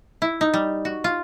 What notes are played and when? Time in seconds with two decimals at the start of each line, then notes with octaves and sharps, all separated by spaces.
0.22 E4
0.41 D#4
0.54 G3
0.85 F#4
1.04 F4